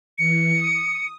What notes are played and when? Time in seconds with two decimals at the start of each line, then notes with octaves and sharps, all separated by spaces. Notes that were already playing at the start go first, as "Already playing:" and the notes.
0.18 E3 C#7
0.53 D#6